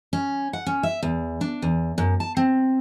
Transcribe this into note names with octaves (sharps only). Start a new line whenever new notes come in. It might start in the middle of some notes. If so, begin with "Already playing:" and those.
C#4
F#5
C#4
E5
E2
D4
E2
F#2
A5
C4